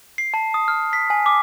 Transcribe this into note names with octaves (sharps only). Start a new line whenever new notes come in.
C7
A5
D#6
F6
B6
G#5
D6